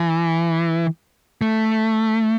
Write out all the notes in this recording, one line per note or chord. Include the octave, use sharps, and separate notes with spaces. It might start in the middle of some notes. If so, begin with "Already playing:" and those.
Already playing: E3
A3